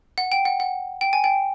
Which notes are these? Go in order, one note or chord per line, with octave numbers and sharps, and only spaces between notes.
F#5
G5
F#5
F#5
G5
G#5
G5